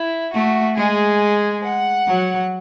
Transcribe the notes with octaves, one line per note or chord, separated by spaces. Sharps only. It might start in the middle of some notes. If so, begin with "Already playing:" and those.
Already playing: E4
A3 F#4
G#3 G#4
F#5
F#3